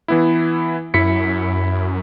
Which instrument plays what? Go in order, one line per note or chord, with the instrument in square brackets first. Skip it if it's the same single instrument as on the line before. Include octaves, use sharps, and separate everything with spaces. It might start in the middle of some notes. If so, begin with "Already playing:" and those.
[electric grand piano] E3 B3 E4
[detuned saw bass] F#2 [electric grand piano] E4 B6 C#7